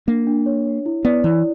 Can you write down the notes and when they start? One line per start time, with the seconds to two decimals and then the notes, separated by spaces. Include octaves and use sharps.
0.07 A#3 D4
0.27 D4
0.46 C#5
0.66 C#5
0.86 E4
1.05 B3 D5
1.24 E3 E4